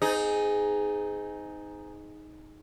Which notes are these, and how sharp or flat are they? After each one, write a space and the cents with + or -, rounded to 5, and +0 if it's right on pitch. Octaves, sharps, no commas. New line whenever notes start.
C4 -35 D#4 +0 G#4 +0